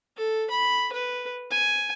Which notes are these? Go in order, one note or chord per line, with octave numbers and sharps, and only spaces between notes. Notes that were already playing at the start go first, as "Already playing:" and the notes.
A4
B5
B4
G#5